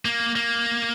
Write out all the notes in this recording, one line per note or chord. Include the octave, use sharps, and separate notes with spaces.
A#3
A#3